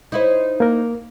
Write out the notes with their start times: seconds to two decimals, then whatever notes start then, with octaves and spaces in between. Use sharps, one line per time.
0.12 D#4 E4 C5
0.60 A#3 A#4